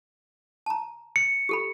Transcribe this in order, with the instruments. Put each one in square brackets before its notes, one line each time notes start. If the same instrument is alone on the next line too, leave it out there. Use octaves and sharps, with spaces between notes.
[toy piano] A5 A#5
[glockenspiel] C#7
[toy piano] G4 A4 B5